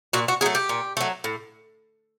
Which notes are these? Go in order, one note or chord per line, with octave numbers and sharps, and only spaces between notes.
A#2 F#4
F#4
F#3 A3 G#4
G4
A#2
F#3 A3
A2